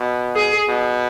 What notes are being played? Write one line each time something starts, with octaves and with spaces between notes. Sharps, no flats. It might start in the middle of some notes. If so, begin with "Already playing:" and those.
Already playing: B2
G#4
B2